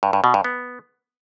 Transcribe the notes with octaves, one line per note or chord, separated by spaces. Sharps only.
G2
G2
B2
G2
B3